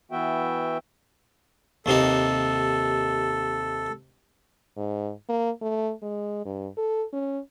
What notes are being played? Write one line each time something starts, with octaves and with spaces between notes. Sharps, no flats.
E3 B3 F#4 E5 G5
D#2 C3 D#4 A4
G#2
A#3
A3
G#3
G2
A4
C#4